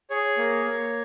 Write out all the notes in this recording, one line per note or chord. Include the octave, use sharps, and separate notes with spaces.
G#4 C#5
A#3
A#3